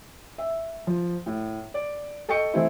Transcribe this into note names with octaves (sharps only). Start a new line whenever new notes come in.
E5
F3
A2
D5
A4 D#5 G5 C#6 C#7
E3 A3 C4 E4